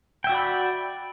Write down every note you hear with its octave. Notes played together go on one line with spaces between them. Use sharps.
F#4 D5 E5 G5 B5